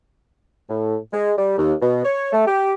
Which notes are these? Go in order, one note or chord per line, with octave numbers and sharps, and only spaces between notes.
A2
G#3
G3
D#2
B2
C#5
A3
G4